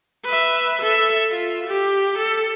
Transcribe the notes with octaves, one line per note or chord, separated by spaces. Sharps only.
B4 E5
A4 E5
F4
G4
A4